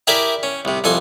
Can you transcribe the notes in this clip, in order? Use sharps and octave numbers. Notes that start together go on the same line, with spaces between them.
E4 G4 G#4 A#4 D5 E5
C#4
C2 C3
C2 F2 A4 G#5 C6